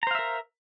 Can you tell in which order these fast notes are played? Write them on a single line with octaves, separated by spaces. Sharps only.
A#5 C5 F5 E5 A#4